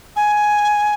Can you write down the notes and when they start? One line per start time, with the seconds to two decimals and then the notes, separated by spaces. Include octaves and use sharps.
0.16 G#5